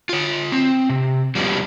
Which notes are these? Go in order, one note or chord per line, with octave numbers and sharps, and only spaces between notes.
F4 C#5
C4
C3
F3 G3 G#3 B3 C#4